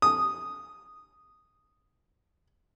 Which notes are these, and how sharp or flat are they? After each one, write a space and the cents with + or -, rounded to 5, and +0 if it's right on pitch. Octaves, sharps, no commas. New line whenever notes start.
D#6 -5